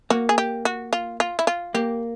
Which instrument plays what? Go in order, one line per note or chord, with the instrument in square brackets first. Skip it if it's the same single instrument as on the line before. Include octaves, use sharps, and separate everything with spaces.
[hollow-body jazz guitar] A#3 [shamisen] F#4
[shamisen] G#4
G4
F#4
F4
F4
E4
F4
[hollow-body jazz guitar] A#3 [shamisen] G4